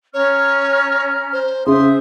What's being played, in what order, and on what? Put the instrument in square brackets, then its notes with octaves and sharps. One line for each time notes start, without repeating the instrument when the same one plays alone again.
[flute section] C#4 A#5 F6 [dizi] C#5
[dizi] C5
[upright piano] C#3 [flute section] C5 E5 D#6 [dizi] C6